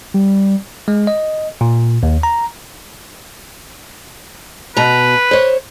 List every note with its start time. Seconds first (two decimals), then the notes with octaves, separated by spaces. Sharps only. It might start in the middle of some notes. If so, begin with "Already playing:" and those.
0.14 G3
0.88 G#3
1.07 D#5
1.61 A#2
2.03 D#2
2.23 A#5
4.77 B2 B4 A#5
5.31 C5 C#5